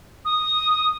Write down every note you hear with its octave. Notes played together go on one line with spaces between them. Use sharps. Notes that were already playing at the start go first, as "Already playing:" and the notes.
D#6